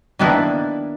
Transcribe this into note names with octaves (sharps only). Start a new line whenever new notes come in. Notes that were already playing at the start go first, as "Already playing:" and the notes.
D#3 A#3 B3 D4 E4